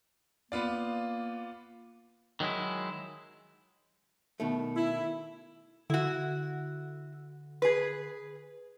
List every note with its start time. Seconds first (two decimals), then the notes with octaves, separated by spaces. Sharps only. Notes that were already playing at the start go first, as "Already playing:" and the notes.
0.52 A#3 B3 F4 D5
2.40 D#3 F#3 G#3 E4
4.40 B2 D#3 A3
4.76 E4
5.90 D3 E4 F#4
7.62 G#4 B4